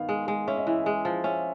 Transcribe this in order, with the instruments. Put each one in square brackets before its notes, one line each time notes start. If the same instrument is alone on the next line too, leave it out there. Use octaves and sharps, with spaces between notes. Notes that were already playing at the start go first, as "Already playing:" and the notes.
Already playing: [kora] D#3 B3 [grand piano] F5
[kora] G#3
G#3
[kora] C#4 [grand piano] E5
[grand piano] D#5
[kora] E3 [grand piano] E5
[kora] G#3
F3
[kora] C#4 [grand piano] E5